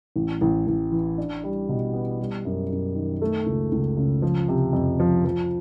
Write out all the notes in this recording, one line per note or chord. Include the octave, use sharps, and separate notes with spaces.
A1
A1
A1
E3
D4
G3
B2
B3
G3
F#2
F#2
D#3
A3
C#2
C#2
C#3
F3
C3
F2
F3
F3